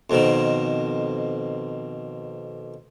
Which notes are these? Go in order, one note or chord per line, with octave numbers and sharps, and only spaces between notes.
F2 B2 D#3